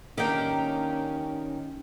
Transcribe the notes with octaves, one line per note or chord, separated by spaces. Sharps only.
D#3 A#3 C#4 D4 G4 A#4 G5